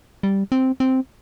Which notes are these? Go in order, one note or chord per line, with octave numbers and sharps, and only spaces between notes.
G3
C4
C4